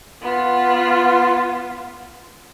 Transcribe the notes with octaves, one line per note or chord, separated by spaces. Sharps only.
B3 F4